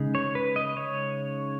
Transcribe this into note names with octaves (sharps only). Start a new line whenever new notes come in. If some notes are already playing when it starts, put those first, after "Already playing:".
Already playing: C#3 G#3 D#4
C#5
B4
D#5
C#5